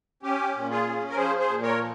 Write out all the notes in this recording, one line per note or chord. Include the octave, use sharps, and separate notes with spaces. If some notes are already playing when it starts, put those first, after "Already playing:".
C#4 G4
A#2
F4 G#4
C#4
A#4
F3 G#4 C5
G#4 C5
A#2
A#4 C#5
F3